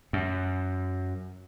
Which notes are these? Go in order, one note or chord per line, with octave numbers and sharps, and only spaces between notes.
F#2